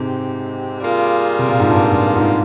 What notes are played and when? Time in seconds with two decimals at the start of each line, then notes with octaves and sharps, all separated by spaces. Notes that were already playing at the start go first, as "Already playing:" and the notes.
Already playing: G#2 C3 G#3 C4 G4
0.80 G3 A#3 F4 G#4
1.39 C3
1.49 A#2
1.60 G#2
1.70 G2
1.93 G2
2.16 G#2